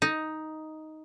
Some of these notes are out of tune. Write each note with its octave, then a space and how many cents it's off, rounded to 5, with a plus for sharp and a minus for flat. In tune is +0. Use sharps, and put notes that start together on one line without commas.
D#4 +5